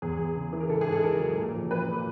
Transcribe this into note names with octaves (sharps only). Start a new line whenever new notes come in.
E2 G#4
E2
C#3
E3
A#4
G#2 A4
G#4
G#2
A4
D#3 A#4
F#3
A#2
F3
F3 B4
A#2